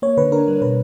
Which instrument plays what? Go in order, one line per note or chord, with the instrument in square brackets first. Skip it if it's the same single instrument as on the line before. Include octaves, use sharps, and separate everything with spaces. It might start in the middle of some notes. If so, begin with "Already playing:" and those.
[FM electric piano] A#3 C#5
D3 B4
D4 A#4
G3
B2 B4